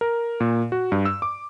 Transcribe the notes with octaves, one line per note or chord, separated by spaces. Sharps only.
A#4
A#2
F#4
G2
E6
D6